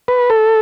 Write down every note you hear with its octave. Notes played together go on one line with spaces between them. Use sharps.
B4
A4